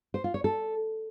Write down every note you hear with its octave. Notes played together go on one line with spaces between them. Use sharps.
C5
F4
C#5
A4